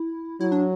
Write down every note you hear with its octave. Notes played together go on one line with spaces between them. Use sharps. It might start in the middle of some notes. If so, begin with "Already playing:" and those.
Already playing: E4
F#3 E4
D4